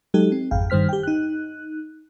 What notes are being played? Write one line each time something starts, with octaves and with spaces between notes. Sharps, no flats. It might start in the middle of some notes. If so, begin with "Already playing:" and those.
F#3 G#3 D#4 G4 A4
C4
G#1 F2 F5 G5
G2 D#3 G3 C5 F6 B6
G4 G5
D#4 F#6